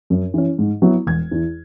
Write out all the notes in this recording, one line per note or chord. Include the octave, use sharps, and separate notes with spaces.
F#2
E3 C#4
G#2
F#3 B3 E4
E1 G#6
E2 E3